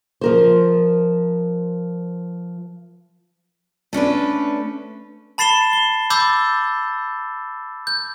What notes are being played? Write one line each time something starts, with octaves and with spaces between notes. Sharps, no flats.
F3 A#4 C5
A3 C#4 D4 B4
A5 B5 A6 C7 E7 G7
G7
B5 D6 E6 G6 A6
G6